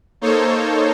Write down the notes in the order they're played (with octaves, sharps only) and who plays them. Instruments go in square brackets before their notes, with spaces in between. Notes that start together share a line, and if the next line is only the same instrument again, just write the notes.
[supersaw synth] A#3 D#4 A4 C5 C#5